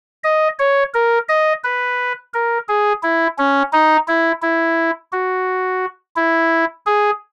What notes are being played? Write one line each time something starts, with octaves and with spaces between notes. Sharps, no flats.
D#5
C#5
A#4
D#5
B4
A#4
G#4
E4
C#4
D#4
E4
E4
F#4
E4
G#4